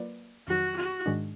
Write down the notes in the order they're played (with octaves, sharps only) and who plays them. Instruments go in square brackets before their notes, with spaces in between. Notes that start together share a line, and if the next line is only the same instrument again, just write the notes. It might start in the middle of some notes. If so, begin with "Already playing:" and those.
Already playing: [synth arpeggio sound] F#3 A#3 F4 B4 D5
[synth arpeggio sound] F2 D#3 F#3 [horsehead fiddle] F#4
[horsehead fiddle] F#4
[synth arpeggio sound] G#2 D#3 G#3 D4